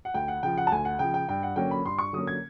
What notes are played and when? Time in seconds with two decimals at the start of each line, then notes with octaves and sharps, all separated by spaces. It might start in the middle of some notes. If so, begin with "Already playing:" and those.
0.05 F#5
0.14 D2 G5
0.28 F#5
0.43 C#3 F3 G5
0.58 F#5
0.67 A5
0.72 D2 G#5
0.85 F#5
0.99 C#3 F3 G5
1.14 G5
1.29 G2 G5
1.43 F#5
1.56 D3 F#3 A#3 C#4 G5
1.71 B5
1.85 G2 C6
1.99 C#6
2.13 D3 F#3 A#3 C#4 D#6
2.27 G#6